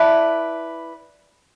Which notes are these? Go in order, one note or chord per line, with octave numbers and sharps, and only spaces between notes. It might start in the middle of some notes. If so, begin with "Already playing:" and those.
Already playing: E4 B4 D5 A5